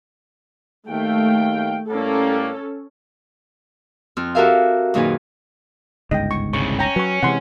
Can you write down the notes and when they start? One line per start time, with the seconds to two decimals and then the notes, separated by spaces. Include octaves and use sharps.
0.88 D#2 A3 F5 G5
1.89 A2 G3 A#3 C#4 A4
4.17 F2 C4 F6
4.35 F#4 G4 A4 A#4 E5 F5
4.94 F#2 A#2 D#3 D#4 G#4 B4
6.11 G1 C#2 G#2 D#5 G5
6.31 C#6
6.53 C2 C#3 C#6
6.79 C#4 G5 A#5
6.96 F#3 B4 C#6
7.23 C3 E3 G#3 F#5 C6